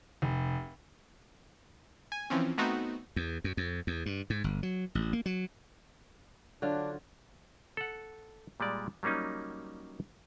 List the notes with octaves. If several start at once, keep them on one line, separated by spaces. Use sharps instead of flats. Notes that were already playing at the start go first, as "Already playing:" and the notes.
F1
G#5
E3 F3 C4 C#4
A3 B3 C4 D#4 F#4
E2
F#2
F2
E2
G2
G#2
G1
F#3
A1
A#3
F#3
D3 F#3 D4 F4
A4 F#5
A#2 G3 G#3 D5
F#3 G3 A#3 C#4 D#4